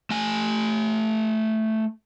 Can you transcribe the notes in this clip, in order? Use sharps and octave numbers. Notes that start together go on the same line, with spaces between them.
A3 G#5